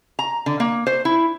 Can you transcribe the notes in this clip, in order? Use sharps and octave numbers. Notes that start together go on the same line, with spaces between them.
A#5
D3
A#3
C5
E4